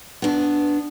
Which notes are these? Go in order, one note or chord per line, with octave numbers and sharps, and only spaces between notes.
B3 D4